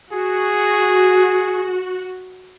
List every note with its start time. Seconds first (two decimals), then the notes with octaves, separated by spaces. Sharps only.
0.12 F#4 G#4